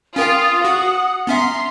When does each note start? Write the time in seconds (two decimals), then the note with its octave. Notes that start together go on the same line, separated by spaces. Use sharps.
0.16 C#4 F4 A#4 G5 D#6
0.65 F#4 F#5
1.27 B3 C#4 E5 A#5 C6